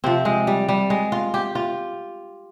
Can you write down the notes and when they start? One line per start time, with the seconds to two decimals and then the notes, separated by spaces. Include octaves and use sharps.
0.04 C3 F3 C4
0.25 G#3
0.47 G3
0.69 G3
0.90 G#3
1.12 F4
1.34 G4
1.55 F4